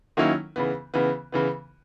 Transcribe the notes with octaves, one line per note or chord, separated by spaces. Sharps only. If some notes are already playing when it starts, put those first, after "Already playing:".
D#3 F#3 A#3 C#4 E4
C#3 E3 B3
C#3 E3 B3
C#3 E3 B3